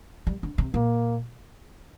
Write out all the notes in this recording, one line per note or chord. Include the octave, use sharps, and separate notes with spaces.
G3
D3
C3
A#2 A#3